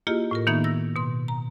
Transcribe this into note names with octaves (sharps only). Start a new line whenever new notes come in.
A#3 E4 F4 G4 G#4 D#5
A2 F4 A#4
D#3 A#3 B3 D#4 E5 G#6
E6 A#6
B2 C6
A#5